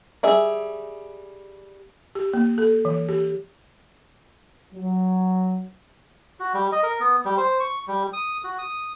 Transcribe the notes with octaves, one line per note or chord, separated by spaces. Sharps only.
G3 G#4 E5
G4
A#3
A4
E3
G4
F#3
F#4
G3
D#5
A#4
B3
G3
C5
C#6
G3
D#6
F#4
D#6